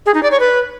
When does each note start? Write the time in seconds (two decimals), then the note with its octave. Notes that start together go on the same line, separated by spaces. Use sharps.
0.06 G#4
0.14 D#4
0.23 D5
0.31 C#5
0.40 B4